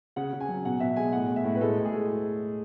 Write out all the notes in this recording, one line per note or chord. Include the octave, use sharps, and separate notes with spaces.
C#3 F#5
C#3
G#5
F#3
B2 F#5
B2 E5
G#3 G#5
A2 F#5
A2
E5
A2
B4
G#3 A4
A2
G#4
G#3